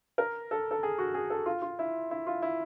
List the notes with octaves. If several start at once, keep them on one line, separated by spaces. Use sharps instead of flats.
A#4
A4
A4
G#4
F#4
G#4
A4
F4
F4
E4
E4
F4
E4